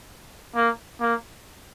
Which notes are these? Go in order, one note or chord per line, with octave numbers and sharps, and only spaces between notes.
A#3
A#3